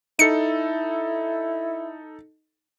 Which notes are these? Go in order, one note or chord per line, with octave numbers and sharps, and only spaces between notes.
D#4 E4 A4 C#7